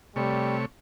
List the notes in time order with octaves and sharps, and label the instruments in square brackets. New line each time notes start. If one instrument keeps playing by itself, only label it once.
[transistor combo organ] C3 A3 C#5 [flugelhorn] G3